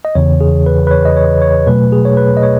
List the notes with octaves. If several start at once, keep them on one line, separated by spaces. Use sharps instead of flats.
D#5
E2 C#3 E3 C#5
G#4
B4
B4
C#5
D#5
C#5
C#5
B2 F#3 A3 B4
G#4
C#5
B4
D#5
C#5